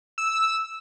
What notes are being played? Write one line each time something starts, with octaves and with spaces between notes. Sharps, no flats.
E6